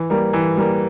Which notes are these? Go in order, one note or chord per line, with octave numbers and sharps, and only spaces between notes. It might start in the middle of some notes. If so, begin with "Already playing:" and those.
Already playing: E3
G3 A#3
E3
G3 A#3